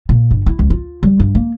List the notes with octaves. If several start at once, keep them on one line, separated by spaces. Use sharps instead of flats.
A#2
G1
E4
C#2
F4
G3
G2
A#3